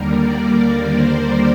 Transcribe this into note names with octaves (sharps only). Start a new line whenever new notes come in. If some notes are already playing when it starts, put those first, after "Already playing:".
Already playing: D#2 D3 G3 A#3 A#4
D5
C5